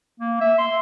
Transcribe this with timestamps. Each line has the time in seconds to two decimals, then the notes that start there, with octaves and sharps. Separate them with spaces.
0.20 A#3
0.41 E5
0.58 C6